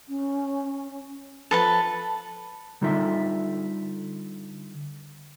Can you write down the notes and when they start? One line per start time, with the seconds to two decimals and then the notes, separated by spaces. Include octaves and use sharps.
0.09 C#4
1.51 F3 A4 B4 A5
2.81 D3 G3 D#4 F4 A4 E5